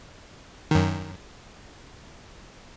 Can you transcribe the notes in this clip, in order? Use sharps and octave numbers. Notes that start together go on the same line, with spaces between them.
F#2 D#3